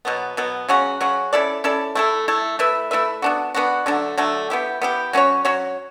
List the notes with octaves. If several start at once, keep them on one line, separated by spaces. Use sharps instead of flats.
B2 F#3 B3
B2 F#3 B3
C#3 F#3 C#4 F#4
C#3 F#3 C#4 F#4
C#4 E4 A4 D5
C#4 E4 A4 D5
A3 E4 A4
A3 E4 A4
A3 E4 B4 E5
A3 E4 B4 E5
B3 D4 F#4
B3 D4 F#4
D3 F#3 A3 D4
D3 F#3 A3 D4
B3 E4 G4
B3 E4 G4
F#3 C#4 F#4 C#5
F#3 C#4 F#4 C#5